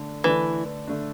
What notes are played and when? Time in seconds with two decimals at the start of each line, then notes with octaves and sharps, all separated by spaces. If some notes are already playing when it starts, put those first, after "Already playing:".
Already playing: D3 A3 D4
0.24 D3 E3 A3 D4
0.87 D3 A3 D4